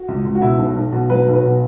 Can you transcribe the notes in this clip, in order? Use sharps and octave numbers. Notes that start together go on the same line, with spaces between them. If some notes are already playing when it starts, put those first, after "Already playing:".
Already playing: F#4
C#2
C#2
F#4
B2 E4
B1
B1
B2
F#3 B4
B1
B4
B2